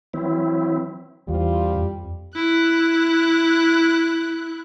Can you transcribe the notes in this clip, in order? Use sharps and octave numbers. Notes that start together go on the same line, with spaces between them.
E3 F#3 C4 E4
E2 G3 C4 E4 F4
F2
E4 F#6